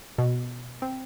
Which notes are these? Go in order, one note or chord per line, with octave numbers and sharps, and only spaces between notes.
B2
C4